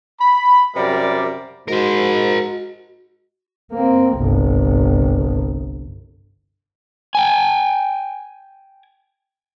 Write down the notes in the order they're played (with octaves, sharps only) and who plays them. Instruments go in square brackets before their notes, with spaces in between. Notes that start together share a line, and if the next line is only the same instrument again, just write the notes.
[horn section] B5
F#2 C3 G3 A#4 D5
[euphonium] G#2 [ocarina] F#4 [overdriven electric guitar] A#4 C5
[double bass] A#3 C4
G1 C2
[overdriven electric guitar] G5 G#5